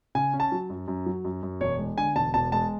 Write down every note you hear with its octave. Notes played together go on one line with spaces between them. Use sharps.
C#3 G#5
C#4
A5
F#3
F#2
F#2
F#3
F#2
F#2
E1 C#5
G#3
D3 G#5
E1 A5
E1 A5
G#3 A5